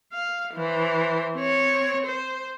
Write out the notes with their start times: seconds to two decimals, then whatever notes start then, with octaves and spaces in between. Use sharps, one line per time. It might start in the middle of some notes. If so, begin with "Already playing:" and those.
0.13 F5
0.54 E3 C5
1.36 C4 C#5
2.06 C5